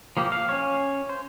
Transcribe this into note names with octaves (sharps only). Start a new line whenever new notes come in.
F3 A#3 G4
F5
C#4 C#5
C5